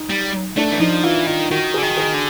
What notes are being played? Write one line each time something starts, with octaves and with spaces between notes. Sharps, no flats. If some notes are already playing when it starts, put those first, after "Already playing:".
Already playing: D#4
G3
A3 D4
E3
F3 D#4
E3 F4
D#3 F4
D#3 F#4
D3 G#4
D#3
G#4
D3